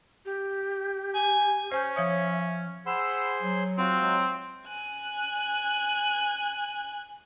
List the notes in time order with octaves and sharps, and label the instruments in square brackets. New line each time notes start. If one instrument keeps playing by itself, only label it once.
[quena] G4
[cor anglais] G#5
[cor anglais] C#4 [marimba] C5 G#5 G6
[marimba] F3 C#5 D#6 [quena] E5
[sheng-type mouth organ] G#4 C5 C6 [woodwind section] F#5 B5 E6
[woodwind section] F#3
[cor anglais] C4 [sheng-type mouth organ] F4 F#4
[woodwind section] F#3 G#3
[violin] G#5 F#6